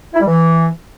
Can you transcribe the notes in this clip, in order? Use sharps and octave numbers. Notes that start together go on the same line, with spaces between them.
E4
G3
E3